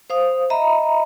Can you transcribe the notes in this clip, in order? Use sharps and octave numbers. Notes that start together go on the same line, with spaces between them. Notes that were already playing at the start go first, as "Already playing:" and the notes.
C5 F5 D#6
D#5 E5 A#5 B5